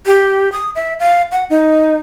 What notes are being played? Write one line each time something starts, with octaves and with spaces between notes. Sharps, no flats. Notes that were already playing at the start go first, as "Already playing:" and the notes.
G4
D#6
E5
F5
F#5
D#4